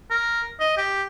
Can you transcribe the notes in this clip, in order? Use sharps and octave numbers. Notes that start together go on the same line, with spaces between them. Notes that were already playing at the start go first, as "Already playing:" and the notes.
A#4
D#5
G4